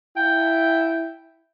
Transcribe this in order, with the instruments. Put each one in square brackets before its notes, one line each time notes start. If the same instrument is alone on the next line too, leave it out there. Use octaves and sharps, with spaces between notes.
[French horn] E4 [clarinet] G5